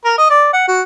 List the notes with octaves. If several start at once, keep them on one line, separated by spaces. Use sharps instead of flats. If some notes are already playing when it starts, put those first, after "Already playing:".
A#4
D#5
D5
F#5
F#4